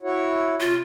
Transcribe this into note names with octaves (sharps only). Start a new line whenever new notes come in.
E4 F#4 C#5
C3 F4